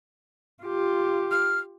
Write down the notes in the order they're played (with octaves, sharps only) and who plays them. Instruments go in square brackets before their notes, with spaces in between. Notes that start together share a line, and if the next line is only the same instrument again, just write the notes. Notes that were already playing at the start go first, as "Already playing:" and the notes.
[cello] F4 G4
[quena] F6